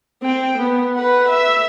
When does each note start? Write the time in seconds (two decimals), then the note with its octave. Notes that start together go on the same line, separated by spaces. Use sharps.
0.22 C4 G5
0.58 B3
0.95 B4 F#5
1.29 E5